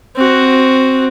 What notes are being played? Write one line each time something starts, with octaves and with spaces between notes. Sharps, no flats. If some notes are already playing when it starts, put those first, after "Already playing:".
C4 F#4